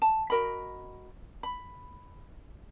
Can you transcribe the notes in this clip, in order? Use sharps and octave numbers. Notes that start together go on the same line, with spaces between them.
A5
F#4 A#4 D#5 B5
B5